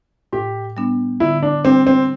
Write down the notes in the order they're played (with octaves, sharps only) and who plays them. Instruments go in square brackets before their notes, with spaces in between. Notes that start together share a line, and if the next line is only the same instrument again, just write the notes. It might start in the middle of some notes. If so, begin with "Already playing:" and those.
[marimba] A2 [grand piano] G4
[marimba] G3 B3 D4
[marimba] D3 [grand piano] E4
[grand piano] D4
[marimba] G3 D4 G4 [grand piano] C4
[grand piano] C4